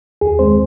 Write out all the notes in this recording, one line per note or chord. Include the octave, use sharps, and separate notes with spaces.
D#2 G#4
D#3 G#3 C4 C5